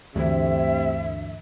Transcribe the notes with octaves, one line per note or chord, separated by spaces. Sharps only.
D2 G2 C3 E3 A3 E5